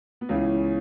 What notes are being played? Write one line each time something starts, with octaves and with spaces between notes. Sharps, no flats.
B3
C#2 C#3 E3 C#4